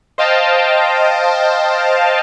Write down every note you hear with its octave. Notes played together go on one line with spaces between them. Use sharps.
C5 D#5 F5 G5 A5